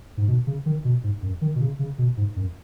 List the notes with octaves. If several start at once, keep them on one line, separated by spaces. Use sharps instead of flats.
G#2
B2
C#3
D#3
B2
G#2
F#2
D#3
B2
C#3
C#3
B2
G#2
F#2